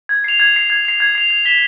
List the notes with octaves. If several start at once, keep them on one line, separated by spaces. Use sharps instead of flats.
G#6
C7 F7
G#6
C7 F7
G#6
C7 F7
G#6
C7 F7
G#6
B6 E7 G7